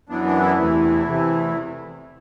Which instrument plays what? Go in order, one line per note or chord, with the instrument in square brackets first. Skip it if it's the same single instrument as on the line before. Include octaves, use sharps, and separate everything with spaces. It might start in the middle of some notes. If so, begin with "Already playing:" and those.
[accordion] F#2 E3 B3 D4
D4
E4
E2 C3 E3 A3
E2 C3 E3 A3